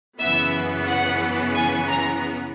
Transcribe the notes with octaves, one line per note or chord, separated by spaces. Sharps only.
F#2 C#3 E3 B3 E5
F#5
G#5
A#5